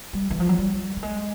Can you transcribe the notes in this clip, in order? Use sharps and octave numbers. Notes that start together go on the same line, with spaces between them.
G3
E3
F3
F#3
G3
G3
G#3